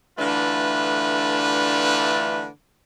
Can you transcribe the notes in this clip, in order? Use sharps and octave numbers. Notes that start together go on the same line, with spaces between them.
D3 E3 A3 D4 F4 B4